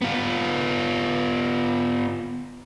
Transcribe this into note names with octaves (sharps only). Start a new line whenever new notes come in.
B3 F4